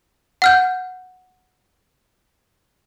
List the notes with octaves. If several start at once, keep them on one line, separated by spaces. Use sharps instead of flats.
F#5 F6 G6